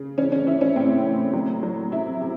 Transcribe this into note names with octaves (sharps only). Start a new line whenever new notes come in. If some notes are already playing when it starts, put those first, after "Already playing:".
Already playing: C#3
E3 C#4
C#4
E3 E4
C#4
A2 C4
A2
F#3
F#3
C3 E4
C3